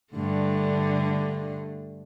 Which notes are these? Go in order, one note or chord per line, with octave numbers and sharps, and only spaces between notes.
G2 D3 A3